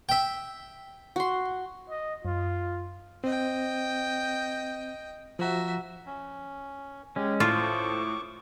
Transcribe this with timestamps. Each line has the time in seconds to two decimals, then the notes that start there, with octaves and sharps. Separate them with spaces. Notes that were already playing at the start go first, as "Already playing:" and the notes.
0.09 E5 G5
1.16 F#4 C6
1.90 D#5
2.25 F#2 F4
3.24 C4 D#5 G5
5.39 F3 F#4 E5 A#5
6.07 C#4
7.16 G#3 C#4 G4
7.40 A2 F4 A4 C5 C#6 D6